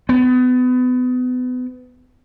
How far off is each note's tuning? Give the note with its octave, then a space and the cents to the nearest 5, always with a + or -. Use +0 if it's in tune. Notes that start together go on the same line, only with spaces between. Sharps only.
B3 +30